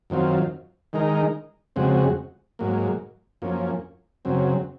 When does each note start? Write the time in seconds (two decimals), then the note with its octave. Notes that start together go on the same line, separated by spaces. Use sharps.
0.10 F#2 D#3 F#3 C4 F4
0.93 D#3 G#3 D#4 A#4
1.76 F2 C#3 G#3 C4 F#4
2.59 G#2 F#3 A#3
3.42 F#2 F3 A#3 C#4
4.25 F#2 C#3 F#3 C4